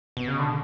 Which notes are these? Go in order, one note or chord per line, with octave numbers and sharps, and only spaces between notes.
B2
C#3
D3